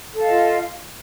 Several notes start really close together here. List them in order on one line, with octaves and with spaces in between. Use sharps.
A4 F5 D#5 F4